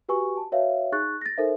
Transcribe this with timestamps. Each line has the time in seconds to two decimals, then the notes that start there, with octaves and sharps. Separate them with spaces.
0.09 F#4 G4 B4 G#5 C#6
0.37 A5
0.52 F#4 B4 C#5 E5 F5
0.92 D#4 G#4 C#6 F#6 A6
1.22 A6 A#6
1.38 D#4 A4 A#4 C5 E5